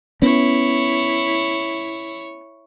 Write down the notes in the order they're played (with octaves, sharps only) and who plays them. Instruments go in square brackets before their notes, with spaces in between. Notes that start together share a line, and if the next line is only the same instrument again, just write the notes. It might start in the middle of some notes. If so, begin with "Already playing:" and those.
[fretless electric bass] B3 C#4 [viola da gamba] E4 C#5